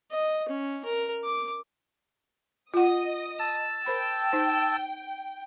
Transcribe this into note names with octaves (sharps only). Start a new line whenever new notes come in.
D#5
C#4
A#4
D6
F4 D#5 F#5 D#6
A5 E6
A#4 C5 G5 B5
D#4 C5